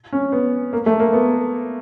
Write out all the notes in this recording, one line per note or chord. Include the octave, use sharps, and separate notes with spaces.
C#4
B3
A#3
A3
A#3
B3